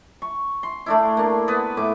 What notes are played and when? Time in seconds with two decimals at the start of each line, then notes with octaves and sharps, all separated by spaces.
0.22 C#6
0.63 C6
0.86 A3 D4 E4
1.17 A#3 D4
1.48 B3 B4
1.77 A2 D6